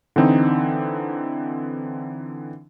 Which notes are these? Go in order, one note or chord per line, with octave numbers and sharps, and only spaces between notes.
D3 E3 C4 D#4